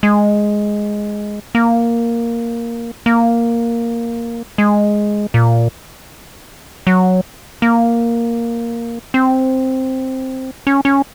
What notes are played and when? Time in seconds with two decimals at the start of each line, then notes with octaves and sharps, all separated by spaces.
0.03 G#3
1.55 A#3
3.06 A#3
4.58 G#3
5.34 A#2
6.87 F#3
7.62 A#3
9.14 C4
10.67 C#4
10.85 C#4